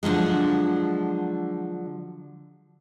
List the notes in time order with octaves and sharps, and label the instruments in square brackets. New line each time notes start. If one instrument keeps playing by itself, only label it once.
[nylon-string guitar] D3 F3 F#3 G#3